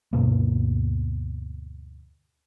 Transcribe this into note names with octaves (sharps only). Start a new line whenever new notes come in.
D2 G2 B2 A#3